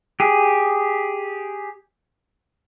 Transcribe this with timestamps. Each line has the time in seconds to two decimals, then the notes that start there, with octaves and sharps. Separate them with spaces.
0.20 G4 G#4